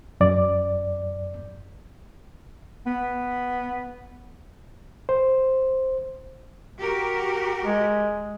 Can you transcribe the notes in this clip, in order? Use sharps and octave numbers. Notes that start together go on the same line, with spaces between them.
F#2 D5
B3
C5
F#4 G4 A#4
G#3